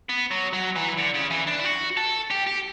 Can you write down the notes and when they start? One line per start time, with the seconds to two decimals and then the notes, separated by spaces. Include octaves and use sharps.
0.09 B3
0.31 F#3
0.53 F#3
0.76 E3
0.97 D3
1.14 C#3
1.30 E3
1.47 D4
1.59 E4
1.65 F#4
1.97 A4
2.31 G4
2.47 G4